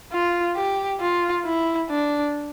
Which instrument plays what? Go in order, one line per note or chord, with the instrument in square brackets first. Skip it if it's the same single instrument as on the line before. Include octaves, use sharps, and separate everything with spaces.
[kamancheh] F4
G4
F4
E4
D4